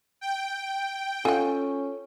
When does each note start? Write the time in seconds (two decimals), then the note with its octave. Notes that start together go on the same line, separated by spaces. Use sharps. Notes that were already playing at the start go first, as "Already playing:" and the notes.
0.21 G5
1.25 C#4 F4 A4 D#5 F#5 G#5